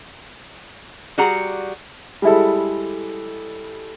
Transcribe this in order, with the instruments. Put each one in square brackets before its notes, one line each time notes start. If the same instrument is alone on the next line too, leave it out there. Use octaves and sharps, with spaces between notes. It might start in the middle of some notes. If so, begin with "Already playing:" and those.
[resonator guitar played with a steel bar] G3 F#4 G#4 F#5 A#5
[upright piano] G3 G#3 E4 A4